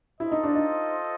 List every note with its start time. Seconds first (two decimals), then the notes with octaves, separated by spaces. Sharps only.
0.20 E4 F4 A4 C5 D#5
0.32 D#4
0.43 D4
0.55 D#4